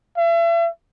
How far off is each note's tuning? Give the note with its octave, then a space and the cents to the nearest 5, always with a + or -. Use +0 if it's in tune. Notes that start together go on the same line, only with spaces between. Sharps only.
E5 +40